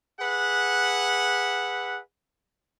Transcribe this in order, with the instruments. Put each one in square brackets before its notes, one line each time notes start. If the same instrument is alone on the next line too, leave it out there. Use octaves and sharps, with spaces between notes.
[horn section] G#4 B4 E5 F#5